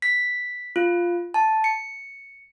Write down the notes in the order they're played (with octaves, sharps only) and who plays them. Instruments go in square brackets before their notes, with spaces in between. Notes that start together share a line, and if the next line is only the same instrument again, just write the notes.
[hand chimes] B6
F4
A5
C#7